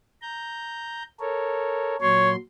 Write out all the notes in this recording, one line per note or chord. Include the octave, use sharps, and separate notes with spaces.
A#5 G6
A4 A#4 C#5
A#2 F#3 C#5 C6